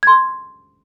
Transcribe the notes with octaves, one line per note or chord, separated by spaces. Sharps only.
C6 G#6